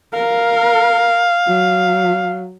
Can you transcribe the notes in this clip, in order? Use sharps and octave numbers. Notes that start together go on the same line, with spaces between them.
A#4 F5
F#3